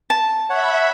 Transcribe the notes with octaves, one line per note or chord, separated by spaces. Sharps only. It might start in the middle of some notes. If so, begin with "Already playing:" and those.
A5
C#5 E5 F#5 B5